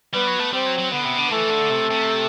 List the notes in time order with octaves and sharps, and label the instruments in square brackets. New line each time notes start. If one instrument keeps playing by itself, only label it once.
[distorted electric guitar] G3 [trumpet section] B3 B4
[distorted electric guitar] F#3
A3
[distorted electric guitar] G3 [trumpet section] C4 C5
[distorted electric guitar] F#3
F#3
[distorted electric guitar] D3 [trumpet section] B3 B4
[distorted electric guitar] C3
D3
[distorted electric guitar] E3 [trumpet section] A3 A4
[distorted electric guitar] D3
C3
C3